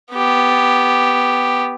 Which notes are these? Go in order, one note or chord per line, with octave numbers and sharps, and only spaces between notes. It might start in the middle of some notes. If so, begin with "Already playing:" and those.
B3 G4